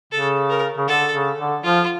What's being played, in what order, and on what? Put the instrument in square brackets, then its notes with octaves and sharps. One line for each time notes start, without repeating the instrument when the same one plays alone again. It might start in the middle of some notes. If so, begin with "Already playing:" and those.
[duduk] C#3 [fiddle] A4
[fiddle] A#4
[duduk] C#3
[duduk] D3 [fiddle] A4
[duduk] C#3
D3
[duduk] F3 [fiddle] F4